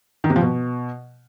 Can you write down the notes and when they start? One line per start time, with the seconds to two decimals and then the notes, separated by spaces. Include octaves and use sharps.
0.24 D#3
0.30 C3
0.36 F3
0.42 B2